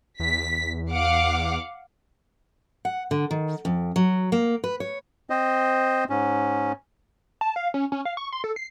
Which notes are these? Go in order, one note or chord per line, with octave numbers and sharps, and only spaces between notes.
E2 B6
F5 F#5 D6
F#5
D3
D#3
F2
F#3
A#3
B4
C#5
C4 C5 D#5
G#2 C#4
A5
F5
C#4
C#4
F5
C#6
C6
A4
C7